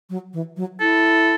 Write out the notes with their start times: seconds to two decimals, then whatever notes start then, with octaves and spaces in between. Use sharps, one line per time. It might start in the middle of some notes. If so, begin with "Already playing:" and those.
0.10 F#3
0.34 E3
0.57 F#3
0.80 E4 A4